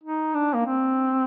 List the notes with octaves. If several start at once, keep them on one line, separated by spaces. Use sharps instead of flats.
D#4
D4
A#3
C4